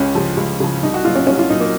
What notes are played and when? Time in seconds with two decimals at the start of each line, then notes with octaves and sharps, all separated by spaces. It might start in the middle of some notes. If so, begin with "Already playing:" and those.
Already playing: C#2 C#4
0.15 C#3 F3
0.37 C#2
0.60 C#3 F3
0.83 C2 D#4
0.94 F#4
1.05 A#2 F#3 F4
1.16 C#4
1.27 C2 C#4
1.39 F4
1.50 A#2 F#3 D#4
1.60 A#3